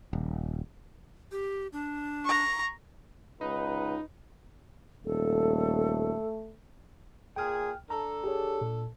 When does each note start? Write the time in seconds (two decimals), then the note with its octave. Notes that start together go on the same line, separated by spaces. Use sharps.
0.13 D#1
1.32 G4
1.73 D4
2.25 A#5 C#6
3.41 C#2 D#4 B4
5.05 D#1 A3 A4
7.36 A#2 G#4 G5 F6
7.90 D4 A4 A#5
8.24 G4 G#4 C#5
8.61 A#2